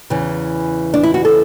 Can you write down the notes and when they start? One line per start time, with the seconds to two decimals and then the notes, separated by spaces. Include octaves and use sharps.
0.10 E2 C#3 E3
0.94 D4
1.03 E4
1.14 F#4
1.25 A4